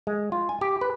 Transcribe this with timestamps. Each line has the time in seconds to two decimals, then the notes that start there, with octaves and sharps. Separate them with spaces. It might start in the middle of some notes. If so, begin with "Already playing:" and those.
0.07 G#3
0.32 F4
0.49 G#5
0.61 G4
0.81 B4